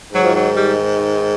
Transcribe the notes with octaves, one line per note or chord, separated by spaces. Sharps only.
G#2 D#3 F#3
F3
F#3
G3